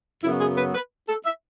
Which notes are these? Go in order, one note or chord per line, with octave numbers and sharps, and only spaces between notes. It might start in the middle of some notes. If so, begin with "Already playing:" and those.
F#2 C#3 F#3 B3 E4
G#4
B4
B4
A4
E5